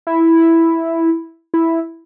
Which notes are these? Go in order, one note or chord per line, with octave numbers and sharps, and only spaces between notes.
E4
E4